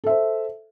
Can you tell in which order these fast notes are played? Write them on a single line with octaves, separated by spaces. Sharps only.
A4 E5 C5